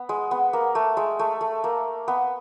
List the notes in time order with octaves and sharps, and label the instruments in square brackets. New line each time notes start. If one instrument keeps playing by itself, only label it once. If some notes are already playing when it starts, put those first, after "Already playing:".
Already playing: [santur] B3
G#3
B3
A#3
A3
G#3
A3
A3
A#3
B3